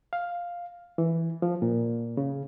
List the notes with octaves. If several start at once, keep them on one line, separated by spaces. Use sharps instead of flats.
F5
E3
F3
A#2
C#3